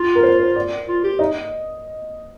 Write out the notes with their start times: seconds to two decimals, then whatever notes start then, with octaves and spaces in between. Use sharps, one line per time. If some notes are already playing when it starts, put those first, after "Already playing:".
Already playing: F4
0.15 A#4
0.23 C5
0.39 C5
0.56 D5
0.88 F4
1.04 G4
1.19 D#4 D#5